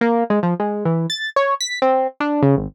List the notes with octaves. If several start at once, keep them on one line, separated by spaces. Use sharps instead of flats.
A#3
G#3
F3
G#3
E3
A6
C#5
B6
C4
D4
C#3
G#1